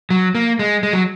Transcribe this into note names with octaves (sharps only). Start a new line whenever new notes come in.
F#3
A#3
G#3
G#3
F#3